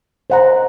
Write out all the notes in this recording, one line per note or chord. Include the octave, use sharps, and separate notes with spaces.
C5 D#5 F#5 A#5